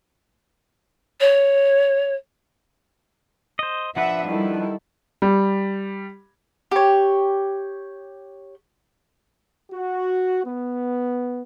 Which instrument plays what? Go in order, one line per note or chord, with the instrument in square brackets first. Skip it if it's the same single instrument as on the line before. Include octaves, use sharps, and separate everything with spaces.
[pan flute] C#5
[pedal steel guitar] C5 D#5
[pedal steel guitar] F3 D4 B4 [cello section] E5 [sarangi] F#5
[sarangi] D#3 [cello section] G3 [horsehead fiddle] E4 A4
[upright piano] G3
[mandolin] G4 C#5
[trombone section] F#4
B3